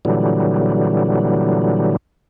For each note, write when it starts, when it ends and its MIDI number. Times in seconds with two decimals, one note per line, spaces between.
0.05 1.96 46
0.05 1.96 50
0.05 1.96 52
0.05 1.96 54
0.05 1.96 55